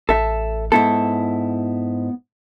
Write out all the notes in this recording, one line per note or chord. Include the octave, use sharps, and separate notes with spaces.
A1 A4 E5
G#2 B3 E4 A4